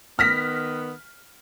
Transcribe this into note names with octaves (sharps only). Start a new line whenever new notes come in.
D#3 B3 F6 A#6 B6